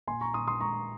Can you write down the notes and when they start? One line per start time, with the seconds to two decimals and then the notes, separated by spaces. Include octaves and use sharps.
0.07 A#2 G#5 C6
0.21 A#5 C#6
0.34 A#2 C6 D#6
0.47 C6 D#6
0.61 G#3 A#5 C#6